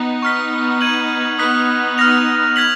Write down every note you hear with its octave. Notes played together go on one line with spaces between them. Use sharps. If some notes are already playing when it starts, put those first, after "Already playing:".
Already playing: B3 D#4
C#6 F6 B6
G#6 D#7 F#7
B3 D#4 D#6 F#6 B6
F6 A#6 F7
F6 G#6 B6 F#7